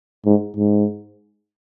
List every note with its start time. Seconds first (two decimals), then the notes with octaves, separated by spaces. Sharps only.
0.26 G#2
0.57 G#2